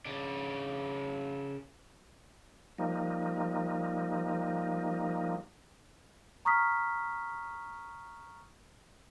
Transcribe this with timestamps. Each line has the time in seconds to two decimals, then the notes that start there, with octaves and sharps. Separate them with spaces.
0.05 C#3 D4
2.78 F3 G3 A#3 D#4
6.45 A#5 C#6 D#6 F6 B6